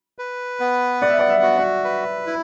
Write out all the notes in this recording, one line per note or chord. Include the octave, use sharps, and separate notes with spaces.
B4
B3
D5 F#5
E5
D5
E5
F#4
D5
B4
E4